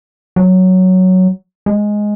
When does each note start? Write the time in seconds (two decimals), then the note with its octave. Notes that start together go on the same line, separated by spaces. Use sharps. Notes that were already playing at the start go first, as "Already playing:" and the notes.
0.36 F#3
1.66 G#3